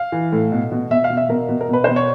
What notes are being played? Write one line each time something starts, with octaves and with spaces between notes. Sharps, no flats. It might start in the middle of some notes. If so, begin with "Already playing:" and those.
Already playing: F5
E3
A2
B2
B2
B2 E5
F5
B2
E5
B2 A#4
B2
A#4
B2 B4
B2 C5
C#5